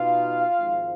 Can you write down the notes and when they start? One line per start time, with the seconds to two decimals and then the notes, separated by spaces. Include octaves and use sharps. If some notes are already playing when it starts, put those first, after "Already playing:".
Already playing: B2 B3 D#4 F4 F5
0.56 G#1 G#2 F3